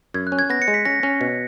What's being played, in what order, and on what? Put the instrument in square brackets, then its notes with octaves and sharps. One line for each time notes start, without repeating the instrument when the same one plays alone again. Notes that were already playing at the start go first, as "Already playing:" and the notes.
[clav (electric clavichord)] F#2 [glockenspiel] G#6
[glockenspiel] F#6
[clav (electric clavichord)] C#4
[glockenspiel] G#6
[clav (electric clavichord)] B3 [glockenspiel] A#6
[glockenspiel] C#7
[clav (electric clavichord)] G#3
[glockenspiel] B6
[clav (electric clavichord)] C#4 [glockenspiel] A#6
[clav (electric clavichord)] C#4
B2